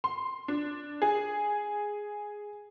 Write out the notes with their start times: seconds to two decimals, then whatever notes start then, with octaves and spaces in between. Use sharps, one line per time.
0.04 C6
0.48 D4
1.02 G#4